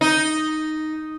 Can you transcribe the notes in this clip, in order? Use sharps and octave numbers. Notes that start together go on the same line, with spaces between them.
D#4